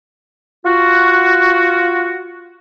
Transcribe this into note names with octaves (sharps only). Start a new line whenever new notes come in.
F4 F#4